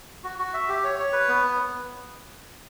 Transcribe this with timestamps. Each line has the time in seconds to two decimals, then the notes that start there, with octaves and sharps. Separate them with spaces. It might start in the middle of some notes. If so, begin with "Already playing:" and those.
0.24 F#4
0.39 F#4
0.54 E5
0.69 G4
0.84 C#5
0.99 C#5
1.13 B4
1.28 B3